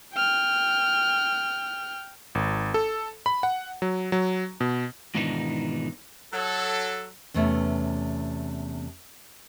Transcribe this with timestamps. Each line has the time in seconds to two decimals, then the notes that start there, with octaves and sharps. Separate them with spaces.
0.14 G5 F6
2.35 G#1
2.74 A4
3.26 B5
3.43 F#5
3.82 F#3
4.12 F#3
4.60 B2
5.15 G#2 B2 D#3 E3 D4 D#4
6.32 F#3 A4
7.34 E2 C3 A3 B3 C#4 E5